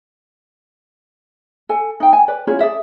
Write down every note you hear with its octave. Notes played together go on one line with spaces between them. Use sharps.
A4 G#5
D#4 G5
G#5
B4 D5
C#4 E4 F4 G#4
G#4 A4 D5 E5